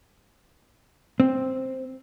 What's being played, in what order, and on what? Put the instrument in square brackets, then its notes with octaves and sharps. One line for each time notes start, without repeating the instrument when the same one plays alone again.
[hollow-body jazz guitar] C4